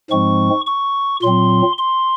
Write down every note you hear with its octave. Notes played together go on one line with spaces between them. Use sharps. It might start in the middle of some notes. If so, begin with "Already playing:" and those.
G#2 F3 G#3 C4 C#6
C#6
A#2 F#3 C4 C6
C6